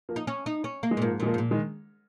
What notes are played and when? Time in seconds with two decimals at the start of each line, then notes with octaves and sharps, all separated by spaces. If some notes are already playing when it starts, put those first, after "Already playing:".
0.09 F3 A#3
0.16 D#4
0.27 C#4
0.46 D#4
0.64 C#4
0.83 A#3
0.91 G#3
0.97 A#2
1.01 G#2 F3 A#3
1.20 A#2 G#3
1.26 F3 A#3
1.34 G#2
1.38 A#2
1.51 D#3 G#3